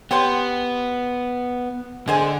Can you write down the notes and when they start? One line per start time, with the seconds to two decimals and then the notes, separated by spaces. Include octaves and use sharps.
0.11 B3 G4 C#5 C6
2.08 D3 G#3 C5 G#5